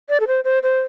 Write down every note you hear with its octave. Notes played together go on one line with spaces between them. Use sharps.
D5
A4
C5
C5
C5